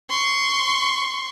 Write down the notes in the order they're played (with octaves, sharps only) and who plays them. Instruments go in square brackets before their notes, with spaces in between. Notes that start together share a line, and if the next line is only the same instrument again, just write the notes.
[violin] C6 C#6